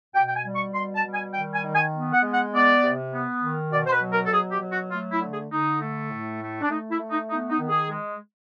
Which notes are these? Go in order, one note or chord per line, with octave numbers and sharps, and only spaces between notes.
B2 G5
G5
G#5
G3
C#6
B2 C6
A5
G3
G#5
D#3 G5
G#5
D#3
G#5
B3
F#5
G#3
F#5
B3 D5
C3
B3
D#3
B2 D5
C5
B4
F#3
A#4
A4
B2 G#4
G4
F#3
F#4
A3 F4
E4
D3
G#4
D3 D#4
A3
A2
A3
D4
A3 D#4
E4
A3
D#4
B3 D#4
D#4
D#3
G#4
G#3